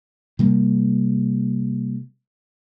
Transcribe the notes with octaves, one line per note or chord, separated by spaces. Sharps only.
C3 G3 A#3